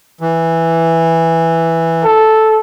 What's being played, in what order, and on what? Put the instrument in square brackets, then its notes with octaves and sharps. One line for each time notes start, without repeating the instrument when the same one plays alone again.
[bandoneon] E3
[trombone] A4